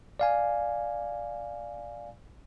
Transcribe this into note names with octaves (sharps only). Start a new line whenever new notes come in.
D5 F5 G#5